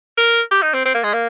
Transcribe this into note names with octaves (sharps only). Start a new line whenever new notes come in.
A#4
G4
D#4
C4
C4
A#3
G#3
A#3